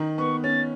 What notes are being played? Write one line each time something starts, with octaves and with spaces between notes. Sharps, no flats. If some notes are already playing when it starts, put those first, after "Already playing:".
Already playing: D#3 D#4
B3 C#6
C#4 A6